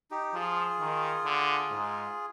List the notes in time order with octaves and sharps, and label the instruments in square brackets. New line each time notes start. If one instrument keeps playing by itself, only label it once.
[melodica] D#4 G4
[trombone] F3 [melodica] F4 G#4
[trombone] D#3
D3
G#2